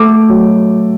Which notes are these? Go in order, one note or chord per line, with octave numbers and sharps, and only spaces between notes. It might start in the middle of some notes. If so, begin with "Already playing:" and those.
Already playing: A3 D6
F#3